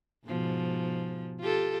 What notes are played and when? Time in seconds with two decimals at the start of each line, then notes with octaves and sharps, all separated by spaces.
0.26 G#2 B2 F3
1.40 F4 G4 A4